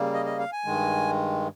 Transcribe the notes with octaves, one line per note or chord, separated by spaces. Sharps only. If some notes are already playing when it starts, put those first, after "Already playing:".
Already playing: C#3 G3 A#3
D#5
D#5
F5
G#5
G2 D#3 G#3